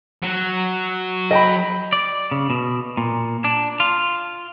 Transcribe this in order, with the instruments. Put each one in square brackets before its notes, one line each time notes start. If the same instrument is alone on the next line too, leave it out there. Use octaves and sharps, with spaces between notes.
[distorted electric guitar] F#3
[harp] D#5 G5 B5
[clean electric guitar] D5
C#3
B2
A#2
D4
F4